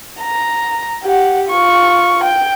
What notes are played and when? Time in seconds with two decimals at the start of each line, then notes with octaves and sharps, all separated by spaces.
0.21 A#5
1.03 G4 F#5
1.49 F4 C#6
2.24 G5